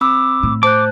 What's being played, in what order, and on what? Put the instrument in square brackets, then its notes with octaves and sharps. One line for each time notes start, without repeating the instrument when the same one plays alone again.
[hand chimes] C4 B5 E6 [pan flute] D6
[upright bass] A2
[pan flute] C5 [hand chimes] A5 F#6 [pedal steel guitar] D6